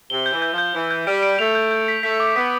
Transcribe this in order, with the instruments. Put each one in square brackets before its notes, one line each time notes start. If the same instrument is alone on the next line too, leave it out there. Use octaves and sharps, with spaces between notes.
[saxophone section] C3 [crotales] G7
[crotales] G6
[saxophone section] E3
[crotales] G6
[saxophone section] F3 [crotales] G6
[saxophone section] E3 [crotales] G7
[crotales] G6
[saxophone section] G3 [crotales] D7
[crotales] D7
[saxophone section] A3 [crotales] F7
[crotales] G6
G6
B6
[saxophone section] A3 [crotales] B6
[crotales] D6
[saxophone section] B3 [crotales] B6